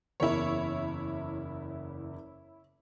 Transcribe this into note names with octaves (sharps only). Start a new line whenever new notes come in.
F#1 E2 E4 A#4 C#5